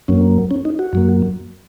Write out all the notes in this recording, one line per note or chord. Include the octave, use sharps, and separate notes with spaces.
F#2 F#3 A#3 C#4
C#4
D#4
F#4
F#2 F#3 A#3